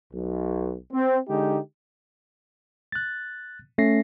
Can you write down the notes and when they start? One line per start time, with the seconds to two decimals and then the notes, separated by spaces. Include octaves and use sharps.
0.13 B1
0.93 C4
1.29 D3 G#3 D#4 G4
2.92 F#6 A6
3.78 A3 C#4 A#6 C7